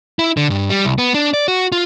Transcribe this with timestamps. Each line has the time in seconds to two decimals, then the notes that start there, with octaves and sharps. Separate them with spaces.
0.19 E4
0.37 D3
0.50 G2
0.70 G3
0.85 C2
0.98 B3
1.14 D4
1.34 D5
1.48 F#4
1.72 F4